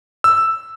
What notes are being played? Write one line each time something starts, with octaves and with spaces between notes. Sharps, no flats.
E6